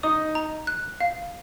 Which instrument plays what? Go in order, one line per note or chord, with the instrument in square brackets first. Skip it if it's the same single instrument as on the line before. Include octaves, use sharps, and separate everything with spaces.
[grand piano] D#4 D#5 [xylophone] D#6
[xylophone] A#5
F#6
F5